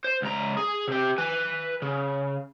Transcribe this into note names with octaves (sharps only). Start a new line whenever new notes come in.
C5
C#2 A#5
G#4
C3 G4
B4 G#5
C#3